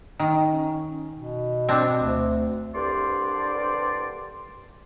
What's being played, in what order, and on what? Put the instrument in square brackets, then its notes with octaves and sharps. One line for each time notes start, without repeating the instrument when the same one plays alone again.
[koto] D#3
[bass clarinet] C#4
B2
[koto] C4 D4
[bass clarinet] D2
[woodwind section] C2 G2 D3 D5 C6